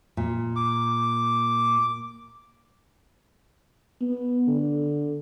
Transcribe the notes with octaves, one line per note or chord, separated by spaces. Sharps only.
A#2
D6
B3
D3